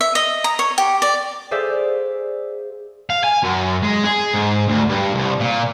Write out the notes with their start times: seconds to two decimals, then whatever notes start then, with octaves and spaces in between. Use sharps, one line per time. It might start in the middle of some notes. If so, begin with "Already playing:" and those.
0.01 E5
0.15 D#5
0.44 A#5
0.59 C#5
0.78 G4
1.02 D5
1.51 G#4 C5 D5 E5 F5
3.10 F5
3.24 G#5
3.43 F#2
3.83 G#3
4.04 G#4
4.34 G#2
4.68 D2
4.89 G2
5.14 C2
5.40 A#2